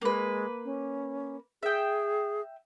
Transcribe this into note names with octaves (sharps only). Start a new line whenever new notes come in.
G#3 A#3 B4
C#4
G#4 E5 G5